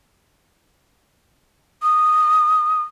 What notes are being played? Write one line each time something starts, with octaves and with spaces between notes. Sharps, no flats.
D#6